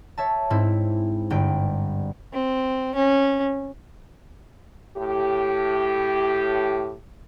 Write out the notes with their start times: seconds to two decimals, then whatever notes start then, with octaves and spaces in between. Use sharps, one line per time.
0.18 C#5 E5 A5
0.50 G#2 C4 E4
1.30 G1 G2 G5
2.33 C4
2.95 C#4
4.97 A2 G4